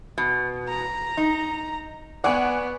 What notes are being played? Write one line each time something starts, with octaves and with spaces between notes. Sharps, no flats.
B2
A#5
D#4
B3 D5 F#5 G#5 C#6